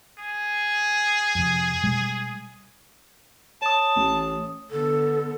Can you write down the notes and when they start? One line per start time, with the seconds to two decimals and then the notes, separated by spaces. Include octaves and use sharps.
0.19 G#4
1.35 F2 C3
1.83 B2 G3 G#3
3.62 C#5 A5 D#6
3.96 A1
4.71 D3 B3 A4